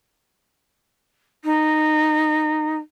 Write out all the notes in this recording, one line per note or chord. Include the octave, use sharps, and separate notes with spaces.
D#4